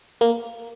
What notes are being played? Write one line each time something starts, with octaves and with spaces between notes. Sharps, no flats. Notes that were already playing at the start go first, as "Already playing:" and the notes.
A#3